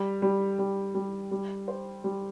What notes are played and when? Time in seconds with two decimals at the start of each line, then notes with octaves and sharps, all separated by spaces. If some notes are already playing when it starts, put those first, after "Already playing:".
Already playing: G3
0.22 G3
0.59 G3
0.95 G3
1.31 G3
1.68 C5
2.04 G3